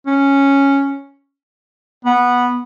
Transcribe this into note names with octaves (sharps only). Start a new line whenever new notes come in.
C#4
B3